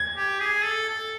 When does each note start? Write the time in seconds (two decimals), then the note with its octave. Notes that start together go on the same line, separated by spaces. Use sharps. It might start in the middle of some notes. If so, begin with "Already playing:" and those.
Already playing: G#6
0.17 G4
0.40 G#4
0.65 A4
0.89 A4